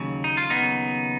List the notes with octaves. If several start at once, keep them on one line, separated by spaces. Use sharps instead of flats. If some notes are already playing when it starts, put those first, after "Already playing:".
Already playing: D#2 C#3 F#3
D#4
F4
B3 D#4
D#2 C#3 F#3